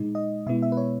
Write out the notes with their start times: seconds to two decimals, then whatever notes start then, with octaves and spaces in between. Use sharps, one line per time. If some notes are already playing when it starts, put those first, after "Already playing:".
Already playing: A#2 G#3 D#4
0.15 D#5
0.46 B2 G#3 B3 E4 E5
0.62 E5
0.72 B4
0.77 C#5